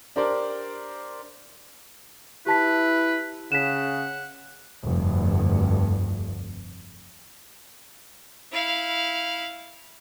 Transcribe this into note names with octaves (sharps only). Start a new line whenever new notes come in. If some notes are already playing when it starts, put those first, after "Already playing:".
D4 G4 A#4 C5 D5
E4 G4 B4 A5 B6
C#3 F#5 B6 E7
F1 D2 G2
E4 F5